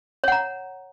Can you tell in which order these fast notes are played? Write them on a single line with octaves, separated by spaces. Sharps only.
C#5 F#5 A#5